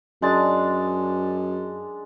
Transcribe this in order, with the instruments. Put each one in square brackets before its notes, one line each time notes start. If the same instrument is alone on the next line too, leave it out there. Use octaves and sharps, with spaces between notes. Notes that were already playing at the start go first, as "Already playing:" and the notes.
[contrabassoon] F#2 [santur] G#3 D4 A5